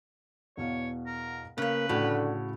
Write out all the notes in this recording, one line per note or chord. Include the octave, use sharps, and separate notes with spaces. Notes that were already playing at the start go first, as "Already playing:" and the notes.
E2 B2 C#5 F5
A#4
C#3 A#3 B4 C#5
A2 D3 F#4